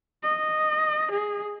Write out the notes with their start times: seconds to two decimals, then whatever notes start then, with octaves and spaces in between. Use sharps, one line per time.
0.23 D#5
1.11 G#4